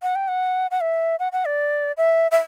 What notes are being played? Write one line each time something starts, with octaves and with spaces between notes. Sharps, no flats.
F#5
G5
F#5
F#5
E5
F#5
F#5
D5
E5
E5